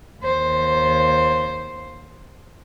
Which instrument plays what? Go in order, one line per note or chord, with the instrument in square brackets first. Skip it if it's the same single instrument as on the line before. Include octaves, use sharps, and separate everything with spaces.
[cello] D#2 C5